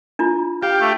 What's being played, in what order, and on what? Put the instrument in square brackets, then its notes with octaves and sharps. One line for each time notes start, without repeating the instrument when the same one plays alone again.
[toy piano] D4 E4 F4
[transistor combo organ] G4 [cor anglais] F5
[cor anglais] A3